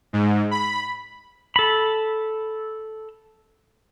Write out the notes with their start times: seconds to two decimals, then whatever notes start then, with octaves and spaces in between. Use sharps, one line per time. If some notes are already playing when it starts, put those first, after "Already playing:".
0.13 G#2
0.51 B5
1.56 A4 B5